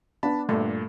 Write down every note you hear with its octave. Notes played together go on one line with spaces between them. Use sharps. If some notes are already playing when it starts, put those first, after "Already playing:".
B3 D4 A5 B5
G2 A#2 A3